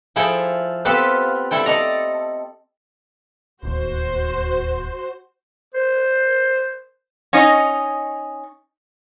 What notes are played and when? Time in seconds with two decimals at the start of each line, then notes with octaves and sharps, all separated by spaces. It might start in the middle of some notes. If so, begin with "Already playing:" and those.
0.16 F3 E4 G#4 A4 G5
0.85 B3 C4 F4 G4 A4 B4
1.51 G3 E4 A4 G5
1.66 A4 D5 D#5 A#5
3.63 D1 D#2 F#4 C5
5.74 C5
7.33 C#4 D#4 D#5